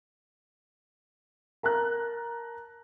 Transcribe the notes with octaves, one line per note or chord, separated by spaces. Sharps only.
A#4 A5 A#5 F#6